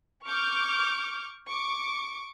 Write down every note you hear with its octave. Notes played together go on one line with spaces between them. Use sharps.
C#6 D6 F6 G6
C#6 D6